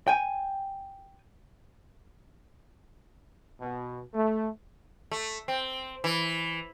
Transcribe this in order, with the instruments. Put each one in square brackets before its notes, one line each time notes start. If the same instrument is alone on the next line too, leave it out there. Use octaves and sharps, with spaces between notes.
[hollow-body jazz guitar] G5 G#5
[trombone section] B2
A3
[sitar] A3
C4
E3